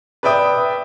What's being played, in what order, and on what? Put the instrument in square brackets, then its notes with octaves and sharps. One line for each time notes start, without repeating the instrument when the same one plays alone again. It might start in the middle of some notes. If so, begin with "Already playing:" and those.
[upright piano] B4 D5 E5 G5 D#6